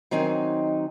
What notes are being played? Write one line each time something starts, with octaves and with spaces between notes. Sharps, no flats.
D#3 F#3 C4 D#4 G#5